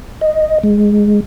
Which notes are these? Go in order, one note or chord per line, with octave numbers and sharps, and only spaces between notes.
D#5
G#3